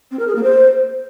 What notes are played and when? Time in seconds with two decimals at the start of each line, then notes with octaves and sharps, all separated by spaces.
0.11 C4
0.19 A#4
0.27 G#4
0.35 A#3
0.43 C5